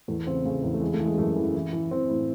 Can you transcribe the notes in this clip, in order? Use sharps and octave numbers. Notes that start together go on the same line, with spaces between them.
E2 A3
C#3 C4
C#3 A3
E2
A3
E3 G#3
A3
E3
G#3
F#2 A3
E3
E3
E3
E3 C4
A2